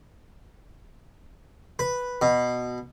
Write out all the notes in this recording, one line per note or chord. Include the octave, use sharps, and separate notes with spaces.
B4
B2